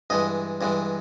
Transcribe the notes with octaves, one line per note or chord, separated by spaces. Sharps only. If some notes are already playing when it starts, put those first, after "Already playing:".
G2 E3 G#3 D#5
G2 E3 G#3